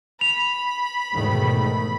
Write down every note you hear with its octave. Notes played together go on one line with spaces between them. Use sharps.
B5 F7
E2 G#2 B2 D#3 A3